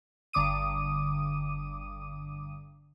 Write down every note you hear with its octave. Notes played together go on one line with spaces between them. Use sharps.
G1 D3 D6 D#6 D#7